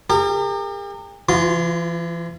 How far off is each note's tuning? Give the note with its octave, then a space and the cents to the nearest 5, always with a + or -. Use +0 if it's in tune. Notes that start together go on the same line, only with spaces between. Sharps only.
G4 +40 A#4 -35
E3 +40 F4 +0 C6 -30